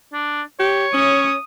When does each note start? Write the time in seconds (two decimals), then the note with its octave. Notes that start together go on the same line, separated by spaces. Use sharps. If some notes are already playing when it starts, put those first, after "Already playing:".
0.13 D4
0.60 G4 C#5
0.94 C#4 D#6